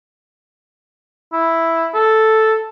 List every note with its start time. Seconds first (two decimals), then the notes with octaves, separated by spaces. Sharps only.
1.33 E4
1.94 A4